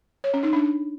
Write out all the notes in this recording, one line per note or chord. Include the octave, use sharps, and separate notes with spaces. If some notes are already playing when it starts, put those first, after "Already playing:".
C#5
C#4
D#4
D4